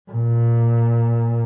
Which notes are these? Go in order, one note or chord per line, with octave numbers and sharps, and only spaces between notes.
A#2